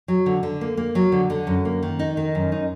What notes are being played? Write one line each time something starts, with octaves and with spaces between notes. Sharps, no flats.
F#3
D3
D3
A#3
A#3
F#3
D3
D3
F#2
A#3
D#3
D#4
D#3
F#2
D#4